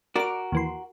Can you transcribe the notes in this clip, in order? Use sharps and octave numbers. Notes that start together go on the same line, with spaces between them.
F#4 A#4 D5 D6
D#2 E3 C6